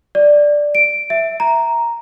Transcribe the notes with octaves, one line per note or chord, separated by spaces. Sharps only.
D5
D7
E5
A#5